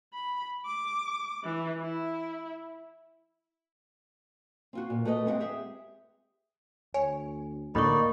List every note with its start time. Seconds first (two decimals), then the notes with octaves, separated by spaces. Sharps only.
0.14 B5
0.66 D6
1.44 E3
1.82 E4
4.73 C4 F4 F#4
4.90 A#2
5.05 A3 F#4 B4 D5 D#5
5.26 G#3 C4 E5 F#5
5.40 G4 G#4 E5
6.94 D2 C#5 G#5
7.75 D2 A2 D3 A#3 D#4 D5 B5 C#6